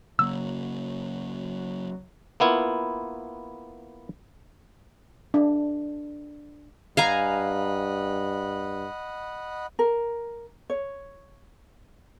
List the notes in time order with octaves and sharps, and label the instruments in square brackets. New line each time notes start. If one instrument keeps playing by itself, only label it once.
[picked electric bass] C#3 A#3 [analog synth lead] F#3 [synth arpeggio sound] E6
[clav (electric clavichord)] A#3 B3 E4 F4
[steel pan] D4
[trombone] G2 [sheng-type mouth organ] D#5 F#5 B5 [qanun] F5 G#5 A#5
[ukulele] A#4
C#5